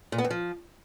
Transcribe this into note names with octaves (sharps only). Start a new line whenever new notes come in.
A#2
B3
F2
F3